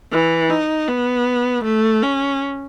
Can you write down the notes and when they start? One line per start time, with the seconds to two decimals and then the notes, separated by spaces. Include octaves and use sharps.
0.12 E3
0.50 D#4
0.88 B3
1.64 A3
2.03 C#4